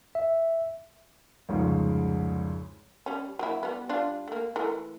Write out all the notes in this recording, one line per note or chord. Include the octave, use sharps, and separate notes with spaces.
E5
C2 F2 G#2 C#3
G3 C#4
F#3 A#3 E4
G3 B3
G3 D4 F4
A3 A#3
E3 A3 A#4